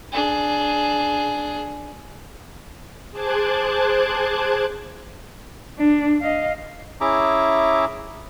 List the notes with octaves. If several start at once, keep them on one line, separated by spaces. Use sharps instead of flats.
D4 G#4
G#4 C5 A5 D6 F#6 G#6
D4
D#5 F5
C#4 E4 G#4 E5 A#5 D6